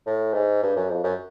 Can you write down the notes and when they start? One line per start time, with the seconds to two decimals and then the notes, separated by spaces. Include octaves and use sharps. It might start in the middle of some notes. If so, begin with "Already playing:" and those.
0.06 A2
0.34 G#2
0.62 G2
0.76 F#2
0.89 F2
1.03 F#2